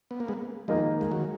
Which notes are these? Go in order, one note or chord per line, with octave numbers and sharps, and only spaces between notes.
B3
A#3
G#3 B3
D#3 F3 G#3 A#3 D#4 A#4 D#5
G#3
D#3 F#3